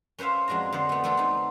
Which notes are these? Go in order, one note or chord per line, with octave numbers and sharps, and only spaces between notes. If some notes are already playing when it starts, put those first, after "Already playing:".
C#4 B4 C5 E5 F5
F2 G#3 D4 F#4 A#5
D3 B3 C5 D5
A3 B3
A3 B3 C4 D4 A4
C4 D#4